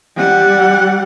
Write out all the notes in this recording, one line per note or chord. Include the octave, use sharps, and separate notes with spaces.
G3 F#5